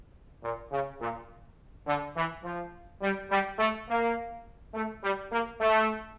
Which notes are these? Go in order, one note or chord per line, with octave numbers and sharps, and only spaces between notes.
A#2
C#3
A#2
D3
E3
F3
G3
G3
A3
A#3
A3
G3
A#3
A3